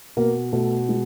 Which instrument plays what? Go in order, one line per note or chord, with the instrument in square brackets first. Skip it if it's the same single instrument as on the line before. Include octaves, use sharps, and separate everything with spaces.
[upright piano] B2 A#3 A#4
B2 A3 A4
G#3